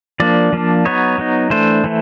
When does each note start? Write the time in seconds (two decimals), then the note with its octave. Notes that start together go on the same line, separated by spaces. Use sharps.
0.20 F3 A#3 D4 D5
0.53 F3 A#3 D4
0.85 F#3 B3 D#4 C#5
1.18 F#3 B3 D#4
1.50 E3 A3 D4 C5
1.84 E3 A3